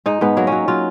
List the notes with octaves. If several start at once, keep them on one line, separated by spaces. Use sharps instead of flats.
G#2 D#4
G#2 B3
F#3 A#3
F#3 C#4
F#3 F4